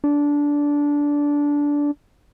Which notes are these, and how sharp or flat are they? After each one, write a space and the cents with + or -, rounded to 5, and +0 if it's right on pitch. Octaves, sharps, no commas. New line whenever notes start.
D4 -15